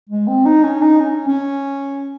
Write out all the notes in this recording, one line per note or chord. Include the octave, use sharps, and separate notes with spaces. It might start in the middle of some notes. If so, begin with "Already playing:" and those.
G#3
C4
D#4
C#4
D#4
C#4
C#4